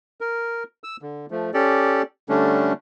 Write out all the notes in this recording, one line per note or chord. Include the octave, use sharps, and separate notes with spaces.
A#4
E6
D3
F3 A3
C#4 G4 A4 D5
D3 G3 A3 C#4 D4